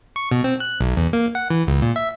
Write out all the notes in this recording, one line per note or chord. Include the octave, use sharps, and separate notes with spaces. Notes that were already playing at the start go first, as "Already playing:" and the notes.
C#6
B2
C4
F#6
B1
E2
A#3
F#5
E3
C#2
A#2
E5